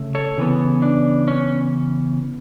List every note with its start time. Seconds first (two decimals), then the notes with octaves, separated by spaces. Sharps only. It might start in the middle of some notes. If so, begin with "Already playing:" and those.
Already playing: C#3 A3
0.15 A4 C#5
0.38 C#3 E3 B3
0.82 D4
1.28 C#4